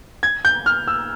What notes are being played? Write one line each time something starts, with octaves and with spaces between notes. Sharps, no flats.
G#6
G6
F6
E6